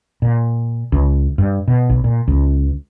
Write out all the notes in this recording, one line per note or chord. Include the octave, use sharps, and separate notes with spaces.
A#2
C#2
G2
B2
B1
A#2
C#2